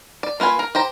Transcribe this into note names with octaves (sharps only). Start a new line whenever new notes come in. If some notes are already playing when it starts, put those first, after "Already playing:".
D5
A#3 F4 B4 G#5
A#4
G4 C5 A#5